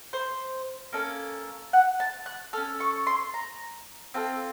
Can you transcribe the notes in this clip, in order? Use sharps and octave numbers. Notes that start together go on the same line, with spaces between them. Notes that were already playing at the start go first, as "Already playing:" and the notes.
C5
A#3 C#4 A4
F#5
A5
F#6
C#4 A4 F6
C#6
C6
A#5
C4 F4 A4